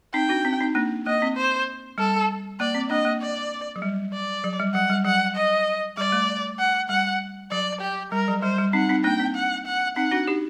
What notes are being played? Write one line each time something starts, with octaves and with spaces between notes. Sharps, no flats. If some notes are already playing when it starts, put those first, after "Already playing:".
C4 D#4 G5
D4 F#4
C4
C4 D#4
A#3 D4
A#3 D#5
C4
C5
G3 A4
A#3 D5
C4
A#3 D4 D#5
A#3
D5
F#3
G3
D5
F#3
G3
F#3 F#5
G3
F#3 F#5
D#5
G3 D5
A3
F#5
G3 F#5
F#3 D5
G4
G3 A#4
F#3
G3 C5
G3
C4 D#4 F#5
C4 D#4
A#3 D4 G5
C4
F#5
F#5
C4 D#4 F#5
D4 F#4
D#4 G4